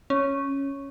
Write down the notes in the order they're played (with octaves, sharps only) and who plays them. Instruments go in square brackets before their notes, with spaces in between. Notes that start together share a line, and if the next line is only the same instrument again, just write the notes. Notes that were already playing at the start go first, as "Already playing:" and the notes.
[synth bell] C#4